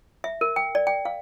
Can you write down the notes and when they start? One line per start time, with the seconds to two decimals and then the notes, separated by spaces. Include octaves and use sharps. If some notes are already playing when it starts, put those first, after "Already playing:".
0.24 E5
0.41 A#4
0.56 G5
0.75 D5
0.87 G5
1.05 F5